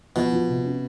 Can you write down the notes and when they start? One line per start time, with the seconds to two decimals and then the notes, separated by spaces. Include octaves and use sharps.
0.16 B2 F3
0.32 F3
0.48 C3
0.65 C#4